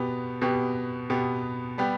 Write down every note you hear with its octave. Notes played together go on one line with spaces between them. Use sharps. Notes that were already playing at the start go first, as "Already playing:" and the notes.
Already playing: B2 B3 G4
B2 B3 G4
B2 B3 G4
G3 B3 G4